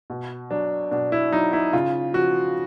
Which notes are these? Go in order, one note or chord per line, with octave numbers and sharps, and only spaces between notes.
B2
F#3 D4
B2 D4
E4
F#3 D#4
E4
C#3 F4
F3 F#4